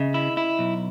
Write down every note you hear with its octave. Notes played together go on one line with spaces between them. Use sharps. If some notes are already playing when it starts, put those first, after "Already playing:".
Already playing: C#3 D#5 E5
E4
E4
B1